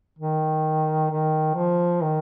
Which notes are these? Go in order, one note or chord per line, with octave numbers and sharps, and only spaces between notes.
D#3
D#3
F3
D#3